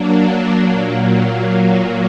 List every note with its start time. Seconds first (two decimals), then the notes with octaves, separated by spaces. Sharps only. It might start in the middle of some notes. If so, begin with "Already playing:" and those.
Already playing: F#3 A#3 D4
0.63 A#2 F#3 A#3